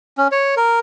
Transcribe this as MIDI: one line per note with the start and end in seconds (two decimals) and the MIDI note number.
0.18 0.28 61
0.32 0.55 73
0.57 0.79 70